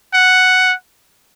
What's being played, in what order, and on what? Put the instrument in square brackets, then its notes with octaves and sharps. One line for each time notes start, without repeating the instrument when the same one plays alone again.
[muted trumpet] F#5